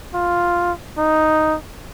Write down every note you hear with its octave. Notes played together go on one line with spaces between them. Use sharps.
F4
D#4